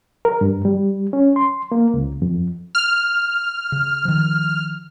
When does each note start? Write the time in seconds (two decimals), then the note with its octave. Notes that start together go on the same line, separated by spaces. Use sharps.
0.25 A#4
0.41 G2
0.65 G3
1.13 C#4
1.36 C6
1.72 A#3
1.94 C#2
2.22 F2
2.75 F6
3.72 C#3
4.05 D#3 F3